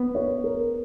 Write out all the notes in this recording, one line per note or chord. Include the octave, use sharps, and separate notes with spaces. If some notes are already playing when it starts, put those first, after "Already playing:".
Already playing: B3
C#5
A#4